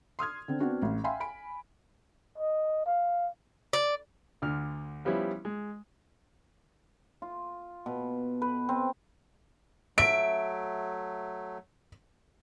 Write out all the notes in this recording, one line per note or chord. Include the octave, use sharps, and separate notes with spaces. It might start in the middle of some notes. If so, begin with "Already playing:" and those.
C6 D#6 F6 G#6
D3 C4
B3 C4 D4 F#4
A1
E5 F5 G5 G#5 B5 C6
G#5 B5 D7
D#5
F5
D5
D2 D3 F6
F3 G3 B3 C#4 E4
G#3
F4
B2
B4
C4
F#3 A3 E5 D7